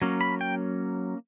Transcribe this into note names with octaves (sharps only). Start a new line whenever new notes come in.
F#3 A#3 C#4
B5
G5